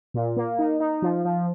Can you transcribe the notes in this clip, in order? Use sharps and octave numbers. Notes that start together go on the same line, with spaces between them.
A#2
A#3
D#4
D#4
F3
F3